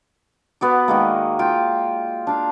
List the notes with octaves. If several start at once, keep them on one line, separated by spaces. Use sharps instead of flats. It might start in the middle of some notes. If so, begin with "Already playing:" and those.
B3 F#4 D5
D#3 G#3 A#3
F4 G5
D4 F5